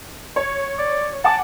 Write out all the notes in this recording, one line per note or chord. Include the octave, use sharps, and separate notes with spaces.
C#5
D5
F#5 G#5 A5 D6